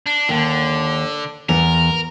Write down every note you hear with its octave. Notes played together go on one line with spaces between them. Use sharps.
D4
D#2 D3
E2 A#4